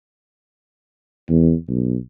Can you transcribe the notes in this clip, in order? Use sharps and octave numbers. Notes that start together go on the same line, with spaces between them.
E2
B1